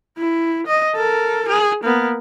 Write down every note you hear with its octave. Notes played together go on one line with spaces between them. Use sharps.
E4
D#5
A4 A#4
G#4
A#3 B3